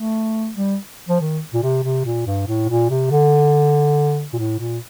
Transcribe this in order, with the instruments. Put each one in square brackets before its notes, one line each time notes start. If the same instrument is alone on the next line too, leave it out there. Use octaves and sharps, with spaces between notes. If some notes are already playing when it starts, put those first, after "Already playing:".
Already playing: [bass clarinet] A3
G3
F3
D#3
A#2
C3
C3
A#2
G2
A2
A#2
C3
D3
A#2
A2
A#2